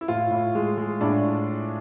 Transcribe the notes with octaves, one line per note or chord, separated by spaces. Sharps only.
E4
A2 F4
A2
G#3
G#3
A2 D4